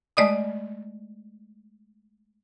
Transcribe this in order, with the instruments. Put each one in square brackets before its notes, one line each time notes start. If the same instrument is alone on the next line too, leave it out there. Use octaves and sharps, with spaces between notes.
[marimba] G#3 A3 D5 D#5 D#6